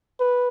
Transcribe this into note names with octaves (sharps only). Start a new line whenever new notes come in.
B4